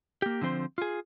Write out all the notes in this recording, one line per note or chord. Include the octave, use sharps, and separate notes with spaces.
A#3 G4
D3 F3 C4 C5
F4 G#4